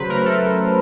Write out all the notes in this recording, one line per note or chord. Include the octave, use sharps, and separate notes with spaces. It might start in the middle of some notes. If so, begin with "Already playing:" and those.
Already playing: C#3 F#3 B4 C5
A3 A#4
A4